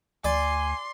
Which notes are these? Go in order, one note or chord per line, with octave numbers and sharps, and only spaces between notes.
D2 D5 G#5 C6